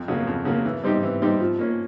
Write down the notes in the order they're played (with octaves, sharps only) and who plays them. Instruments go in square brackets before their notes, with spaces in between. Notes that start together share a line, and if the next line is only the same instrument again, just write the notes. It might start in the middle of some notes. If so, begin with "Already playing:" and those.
Already playing: [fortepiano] F2
C#3 F#3 A#3
F2
C#3 F#3 A#3
E3
G3 C4 D#4 G4
E3
G3 C4 D#4 G4
F3
A#3 C#4